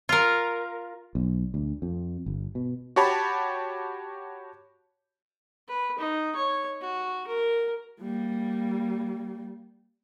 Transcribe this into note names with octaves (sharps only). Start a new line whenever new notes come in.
F4 A#4
B1
D2
F2
G1
B2
F#4 G4 C#5 A5 B5
B4
D#4
C#5
F#4
A#4
G3 A#3